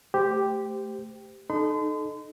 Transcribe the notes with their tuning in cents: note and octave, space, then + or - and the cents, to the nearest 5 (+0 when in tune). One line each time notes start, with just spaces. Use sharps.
A3 +0 G4 +0 C5 -20
D#4 -25 A4 -25 C6 -40